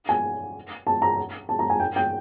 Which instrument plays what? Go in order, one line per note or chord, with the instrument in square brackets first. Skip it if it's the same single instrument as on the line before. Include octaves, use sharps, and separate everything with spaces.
[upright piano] G#5
A5
A#5
A5
A#5
G#5
G5
G5